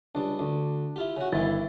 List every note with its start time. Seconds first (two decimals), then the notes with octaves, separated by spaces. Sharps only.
0.15 C#2 G3 D4
0.39 D2 D4
0.96 E4 F4 G4
1.16 C#3 F#4
1.32 G1 D#3 E3 E4 A6